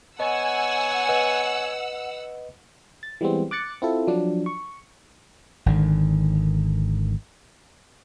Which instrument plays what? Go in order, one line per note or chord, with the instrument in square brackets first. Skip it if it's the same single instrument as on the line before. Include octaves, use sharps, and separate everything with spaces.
[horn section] B3 C#5 G#5 [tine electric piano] D#5 [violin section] F#5 E6
[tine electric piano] B4 D#5
[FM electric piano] A6
E3 G3 G#3 B3 C4
D6 F#6 A6 C#7
C4 E4 F4 A4
F3 F#3 D4
C#6
[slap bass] G#1 D3 D#3